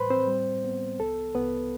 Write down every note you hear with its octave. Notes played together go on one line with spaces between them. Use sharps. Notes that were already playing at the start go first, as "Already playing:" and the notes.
Already playing: A2 G3 B4 C5 B5 C6
C4 C5
G3
B3
C2 A4
C2 B3 B4